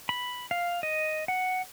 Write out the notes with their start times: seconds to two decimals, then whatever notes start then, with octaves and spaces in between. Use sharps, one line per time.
0.09 B5
0.51 F5
0.83 D#5
1.28 F#5